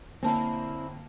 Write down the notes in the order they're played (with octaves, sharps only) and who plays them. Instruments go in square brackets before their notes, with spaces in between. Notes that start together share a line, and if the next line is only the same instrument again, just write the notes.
[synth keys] D3 A#3 [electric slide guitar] C4 E4 [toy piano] D4 C#5 A5